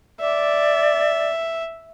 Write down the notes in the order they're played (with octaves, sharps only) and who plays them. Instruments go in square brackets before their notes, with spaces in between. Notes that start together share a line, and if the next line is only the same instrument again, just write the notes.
[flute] D5 [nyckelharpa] E5